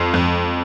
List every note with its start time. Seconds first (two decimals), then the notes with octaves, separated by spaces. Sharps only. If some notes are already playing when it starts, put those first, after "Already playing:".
Already playing: F2
0.14 F2